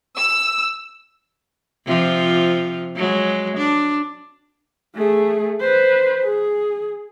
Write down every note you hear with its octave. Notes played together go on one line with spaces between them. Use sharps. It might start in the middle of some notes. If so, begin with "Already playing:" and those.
E6
C3 F3 F4
F#3 G#3
D4
A3 G#4
B4 C5
G#4